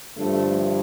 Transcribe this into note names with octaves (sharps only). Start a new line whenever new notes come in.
G2 D3 F3 A3